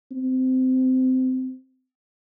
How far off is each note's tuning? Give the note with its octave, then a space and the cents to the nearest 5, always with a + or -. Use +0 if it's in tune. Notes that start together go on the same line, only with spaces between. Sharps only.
C4 -20